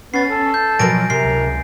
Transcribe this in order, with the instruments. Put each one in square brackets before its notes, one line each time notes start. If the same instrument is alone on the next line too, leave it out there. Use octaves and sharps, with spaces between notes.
[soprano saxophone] B3 [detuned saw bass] C#4 [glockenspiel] A6 C7
[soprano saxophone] A4
[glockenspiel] G6
[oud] B2 F3 A#4 [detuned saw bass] F#3 [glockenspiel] G#5 A#6 D7
[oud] C3 [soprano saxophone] A#4 [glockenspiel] C7
[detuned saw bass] C#2